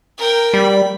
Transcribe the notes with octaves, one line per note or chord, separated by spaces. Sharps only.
A#4 G5
G3 B5